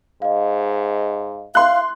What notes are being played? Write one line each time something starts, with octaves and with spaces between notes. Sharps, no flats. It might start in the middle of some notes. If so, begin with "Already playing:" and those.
G#2 D#5 F5
E5 F5 C6 F#6